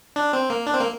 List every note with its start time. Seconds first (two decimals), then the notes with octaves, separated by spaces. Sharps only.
0.16 D4
0.33 C4
0.50 A#3
0.66 D4
0.73 C4
0.81 A#3